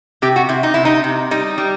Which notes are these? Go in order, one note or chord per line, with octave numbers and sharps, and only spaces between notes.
C3 G4
F#4
C3 E4
D#4
C3 E4
D#4
C3
G3 D#4
G3